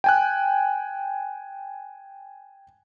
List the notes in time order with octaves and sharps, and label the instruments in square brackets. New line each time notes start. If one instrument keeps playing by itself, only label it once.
[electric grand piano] G5 G#5 F#6